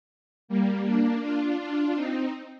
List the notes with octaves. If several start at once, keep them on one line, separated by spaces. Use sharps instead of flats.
G3 A#3
A#3 D4
D4 F4
D4 F4
C4 D#4